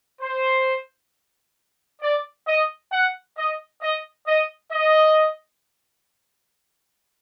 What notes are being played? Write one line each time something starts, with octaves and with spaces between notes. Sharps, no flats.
C5
D5
D#5
F#5
D#5
D#5
D#5
D#5